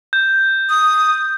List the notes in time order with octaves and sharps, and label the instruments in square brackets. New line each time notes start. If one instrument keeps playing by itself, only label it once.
[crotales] G6
[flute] D#6